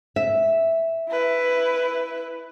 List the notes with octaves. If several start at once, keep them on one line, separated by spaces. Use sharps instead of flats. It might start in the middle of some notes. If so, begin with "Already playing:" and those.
E5
E4 B4